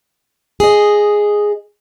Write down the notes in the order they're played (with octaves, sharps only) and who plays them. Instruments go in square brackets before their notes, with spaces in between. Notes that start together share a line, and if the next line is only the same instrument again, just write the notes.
[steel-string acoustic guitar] G#4 D#5